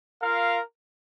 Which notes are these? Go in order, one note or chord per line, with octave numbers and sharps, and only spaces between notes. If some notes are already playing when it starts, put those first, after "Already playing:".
F4 A#4 F5